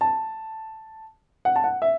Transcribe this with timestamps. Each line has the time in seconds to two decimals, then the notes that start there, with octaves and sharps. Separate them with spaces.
0.01 A5
1.45 F#5
1.56 A5
1.64 F#5
1.82 E5